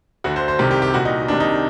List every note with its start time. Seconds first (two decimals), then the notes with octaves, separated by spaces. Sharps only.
0.24 D2 D3 F#4
0.36 C5
0.48 C5
0.59 C2 C3 D#3 G4
0.71 G4
0.82 G4
0.94 C2 A#2 F#4
1.05 D#4
1.28 C2 C3 D#3 D4
1.40 D#4